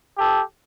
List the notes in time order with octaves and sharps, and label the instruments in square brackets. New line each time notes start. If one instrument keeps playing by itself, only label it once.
[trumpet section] G4 A4